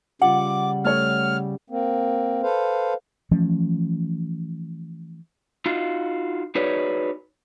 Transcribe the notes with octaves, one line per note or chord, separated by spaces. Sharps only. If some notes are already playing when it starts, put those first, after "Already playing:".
C#3 G3 F4 F#5 D6
A3 C#5 F6
A#3 C4
A4 B4 C5 F5
E3 F3 A3 C#4
D#4 F4 F#4 F5
D#4 F#4 G#4 B4 C#5 D5